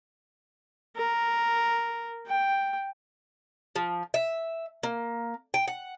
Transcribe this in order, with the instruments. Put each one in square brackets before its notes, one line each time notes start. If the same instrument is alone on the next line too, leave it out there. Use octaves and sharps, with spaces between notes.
[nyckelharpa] A#4
G5
[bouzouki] F3
E5
A#3
G5
F#5